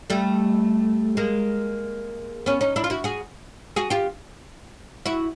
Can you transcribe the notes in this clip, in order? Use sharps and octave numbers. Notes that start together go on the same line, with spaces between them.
G3 A3
G#3 A#3
B3 C#4
C#4 D#4
D4 E4
F4
E4 F#4
F#4 G#4
F#4 G#4
F4 G4
E4 F#4